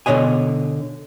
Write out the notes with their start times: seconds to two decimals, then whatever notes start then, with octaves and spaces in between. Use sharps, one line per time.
0.06 B2 D3 C#5 D#5 G#5